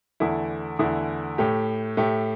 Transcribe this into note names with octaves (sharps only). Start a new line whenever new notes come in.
E2 D3 A3 E4
E2 D3 A3 E4
A2 A3 G4
A2 A3 G4